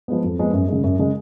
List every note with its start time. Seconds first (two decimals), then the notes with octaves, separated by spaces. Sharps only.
0.08 F3 G#3 B3
0.24 F2
0.39 F3 G#3 B3
0.53 F#2
0.68 C#3 G#3
0.84 F#2
0.99 C#3 G#3